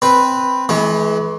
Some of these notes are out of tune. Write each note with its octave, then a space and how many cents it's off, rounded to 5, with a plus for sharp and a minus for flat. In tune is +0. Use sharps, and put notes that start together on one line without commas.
C4 +0 B4 +0
E3 -15 G#3 +40